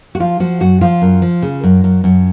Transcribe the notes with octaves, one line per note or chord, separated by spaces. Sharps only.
F#4
F3 F4
F3 F#4
F#2 F#4
F3 F4
F#2
F3
C#3
F#2
F#2
F#2